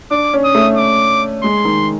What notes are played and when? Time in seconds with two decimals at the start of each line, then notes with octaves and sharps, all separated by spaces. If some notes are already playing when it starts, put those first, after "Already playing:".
0.11 D4 D6
0.34 C#4
0.45 D#6
0.55 A3
0.77 D6
1.43 G#3 C6
1.65 D#3